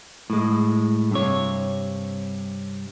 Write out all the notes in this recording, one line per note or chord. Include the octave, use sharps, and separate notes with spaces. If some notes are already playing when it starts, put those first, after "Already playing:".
A2 G#3
G2 C3 C#5